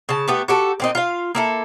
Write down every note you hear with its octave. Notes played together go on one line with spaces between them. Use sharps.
C#3 A5
A3 B3 G4
F#4 G4 A4
A#2 C4 D#5
F4 F5
A#3 E4 A4